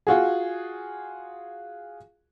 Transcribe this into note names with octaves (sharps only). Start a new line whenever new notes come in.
F4 F#4 G#4